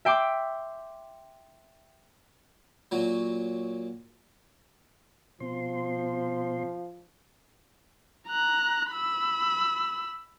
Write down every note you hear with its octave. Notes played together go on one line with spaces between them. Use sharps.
E5 G5 C6 D6
A#2 F#3
B2 F3 C4 C6
A#5 F#6
B5 E6